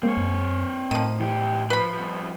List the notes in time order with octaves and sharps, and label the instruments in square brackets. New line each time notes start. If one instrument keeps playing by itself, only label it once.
[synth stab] G#3 A#3 [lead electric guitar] C4 C#5
[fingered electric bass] F#2
[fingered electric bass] A2 [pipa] D#3 F3 [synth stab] D#7
[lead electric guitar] C#2 G4 [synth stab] E3
[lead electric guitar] F3 [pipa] B4 B5
[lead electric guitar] G2 F3